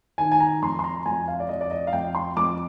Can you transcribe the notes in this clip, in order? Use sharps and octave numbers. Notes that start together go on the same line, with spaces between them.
D#3 G#5
G#5
A#5
F2 C6
C6
A#5
F2 G#5
F5
D5
F2 D#5
D5
D#5
F5
F2 G5
C6
F2 D6